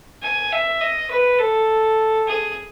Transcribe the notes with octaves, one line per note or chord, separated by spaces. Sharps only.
G#5
E5
D#5
B4
A4
G#4